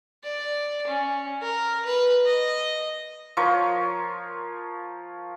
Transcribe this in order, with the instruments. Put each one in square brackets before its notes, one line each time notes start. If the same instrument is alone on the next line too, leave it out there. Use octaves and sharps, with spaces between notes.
[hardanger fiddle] D5
C#4
A#4
B4
D#5
[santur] F3 A#4 C#5 C6